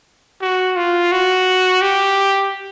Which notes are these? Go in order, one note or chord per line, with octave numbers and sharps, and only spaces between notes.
F#4
F4
F#4
G4